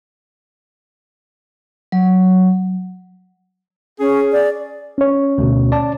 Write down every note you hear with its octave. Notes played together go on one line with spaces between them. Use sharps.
F#3
C#4 G#4
D5
C#4 C#5
D2 B2
D5 A5